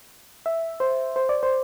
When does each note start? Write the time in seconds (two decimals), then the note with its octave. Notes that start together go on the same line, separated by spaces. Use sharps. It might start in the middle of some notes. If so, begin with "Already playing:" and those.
0.46 E5
0.80 C5
1.16 C5
1.29 D5
1.43 C5